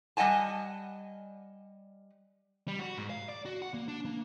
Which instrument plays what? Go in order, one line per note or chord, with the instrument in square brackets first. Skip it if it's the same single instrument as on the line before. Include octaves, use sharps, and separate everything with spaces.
[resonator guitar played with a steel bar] G3 D#5 F#5 G#5 A5
[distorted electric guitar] G3
F#4
G#2
F5
D5
F#4
F#5
A#3
D4
A#3